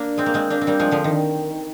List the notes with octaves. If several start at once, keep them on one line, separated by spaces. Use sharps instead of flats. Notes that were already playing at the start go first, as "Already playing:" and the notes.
Already playing: A#3 D4
G#3 C4
A#3
G#3 C4
A#3 D4
C4
G3 A#3
F3 G#3
D3 F3
D#3